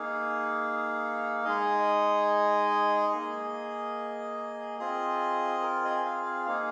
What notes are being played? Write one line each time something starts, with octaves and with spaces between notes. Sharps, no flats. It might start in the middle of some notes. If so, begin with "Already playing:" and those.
Already playing: A#3 D#4 G#4 F5
G#3 D#4 G#4 D#5
A#3 G#4
C4 F4 G#4 D#5
A#4
D#5
G#5
F5
F5
A#3 D#4 G#4 F5